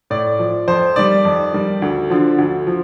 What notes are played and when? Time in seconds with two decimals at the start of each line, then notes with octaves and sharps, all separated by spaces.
0.10 A2 D5
0.39 F3
0.68 F2 C5
0.96 D#3 G3 D5
1.25 F2
1.53 D#3 G3
1.82 D2
2.10 D3 F3
2.38 D2
2.67 F3